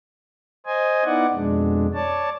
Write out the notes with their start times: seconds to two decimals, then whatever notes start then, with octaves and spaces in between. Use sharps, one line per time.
0.66 C5 D#5 G#5
1.05 B3 D#4 E4 D5 F#5
1.34 F2 B2 G#3 D4
1.94 C#5 D5 A5